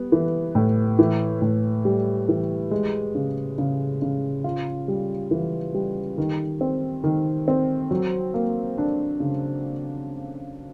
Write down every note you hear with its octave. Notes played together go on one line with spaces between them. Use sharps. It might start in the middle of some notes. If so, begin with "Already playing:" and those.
Already playing: G3 B3
E3
A2
E3
A2
G3
E3
G#3
C#3
C#3
C#3
F4
G3
E3
G3
D#3
C4
D#3
C4
F#3
A#3
D4
C#3